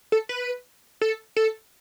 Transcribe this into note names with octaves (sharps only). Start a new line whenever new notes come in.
A4
B4
A4
A4